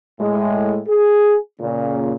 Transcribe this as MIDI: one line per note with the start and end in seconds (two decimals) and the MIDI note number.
0.20 0.80 45
0.20 0.80 56
0.88 1.36 68
1.60 2.14 46
1.60 2.14 49